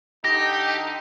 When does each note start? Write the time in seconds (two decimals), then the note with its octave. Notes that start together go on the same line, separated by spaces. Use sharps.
0.24 D3 D#4 G4 A#6